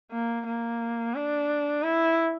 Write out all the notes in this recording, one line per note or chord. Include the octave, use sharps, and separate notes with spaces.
A#3
A#3
D4
E4